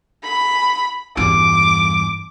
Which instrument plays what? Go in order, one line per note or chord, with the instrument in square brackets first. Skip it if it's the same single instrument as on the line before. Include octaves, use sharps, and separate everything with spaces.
[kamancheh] B5
[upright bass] E2 G2 [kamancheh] D6